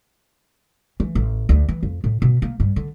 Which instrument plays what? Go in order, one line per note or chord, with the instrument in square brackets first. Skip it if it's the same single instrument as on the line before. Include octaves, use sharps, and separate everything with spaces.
[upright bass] E3
A1
D2
E3
F2
A2
B2
A#3
G2
D3